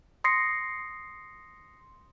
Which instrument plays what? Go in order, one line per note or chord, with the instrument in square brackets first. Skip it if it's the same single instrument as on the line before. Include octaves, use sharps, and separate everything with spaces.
[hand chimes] C6 D#6 A#6 C7 C#7